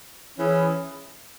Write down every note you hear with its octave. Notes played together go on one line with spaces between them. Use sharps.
E3 C#4 E4 G#4